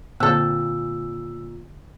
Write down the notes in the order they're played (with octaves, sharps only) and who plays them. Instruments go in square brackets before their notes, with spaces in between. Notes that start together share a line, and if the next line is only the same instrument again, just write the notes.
[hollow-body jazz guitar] A#2 [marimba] D3 [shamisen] C4 A4 [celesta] E6